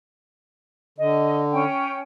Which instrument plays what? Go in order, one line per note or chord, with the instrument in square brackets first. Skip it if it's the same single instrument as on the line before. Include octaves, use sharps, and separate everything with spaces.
[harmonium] D3 [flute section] D#5
[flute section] C#4 G5